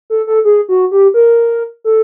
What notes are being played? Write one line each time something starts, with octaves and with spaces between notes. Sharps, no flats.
A4
A4
G#4
F#4
G4
A#4
A4